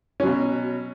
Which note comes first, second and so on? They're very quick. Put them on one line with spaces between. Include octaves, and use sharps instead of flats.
C#4 F#3 B2